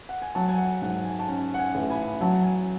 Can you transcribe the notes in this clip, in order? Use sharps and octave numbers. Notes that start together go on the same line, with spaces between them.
F#5
G#5
F#3 F#5 A5
G#5
F#5
G#2 F#5
G#5
A5
C#4 G#5
F#5
G#5
A1
G#5 B5
F#3 F#5 A5
G#5